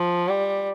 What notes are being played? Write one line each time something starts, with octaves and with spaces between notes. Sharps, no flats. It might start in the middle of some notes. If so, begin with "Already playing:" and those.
Already playing: F3
G3